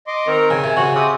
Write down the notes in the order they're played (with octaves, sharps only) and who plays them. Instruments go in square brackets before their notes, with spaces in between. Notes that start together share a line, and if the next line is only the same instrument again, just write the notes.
[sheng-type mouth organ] D#5 C6 D6
[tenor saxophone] D#3 [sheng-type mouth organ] C4 A#4 A#5
[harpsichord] C#3 [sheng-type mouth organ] G#5
[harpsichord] C3
[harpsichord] C#3 [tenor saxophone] F#4
[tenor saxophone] C3 [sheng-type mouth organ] D#6